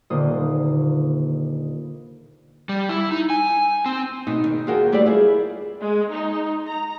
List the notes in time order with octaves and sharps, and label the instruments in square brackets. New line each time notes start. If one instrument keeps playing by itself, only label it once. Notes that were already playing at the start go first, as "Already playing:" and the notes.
[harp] D#1 A#2 D3 A#3 C5 D#6
[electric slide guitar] G3
E4
D#4
G#5
C4
[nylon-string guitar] B2 D#4
D#3
D#2 F4 F#4 G#4 A#4 G5
G3 A3 G4 B4 D5
E4 F4 G#4
[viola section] G#3
D#4
A#5